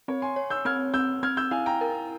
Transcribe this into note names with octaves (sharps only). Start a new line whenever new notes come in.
C4 C#5
G#5 C6
C#5
E6 G6
C4 F6 G#6
C4 E6 G6
C4 F6 G#6
E6 G6
E4 F5 G#5
G5 A#5
A#4